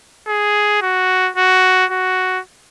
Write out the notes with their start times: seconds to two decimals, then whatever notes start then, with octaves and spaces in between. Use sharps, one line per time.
0.28 G#4
0.82 F#4
1.36 F#4
1.91 F#4